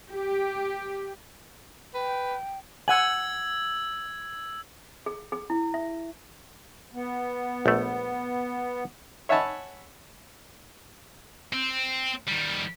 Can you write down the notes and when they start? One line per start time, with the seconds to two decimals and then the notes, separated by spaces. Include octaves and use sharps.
0.11 G4
1.94 B4 G5
2.88 F#5 G#5 E6 G#6 F#7
5.06 G#4
5.32 G#4
5.50 E4
5.74 E5
6.94 B3
7.66 A#1 A3
9.29 C#5 E5 F#5 G#5 A5 B5
11.53 C4
12.28 D#3 G3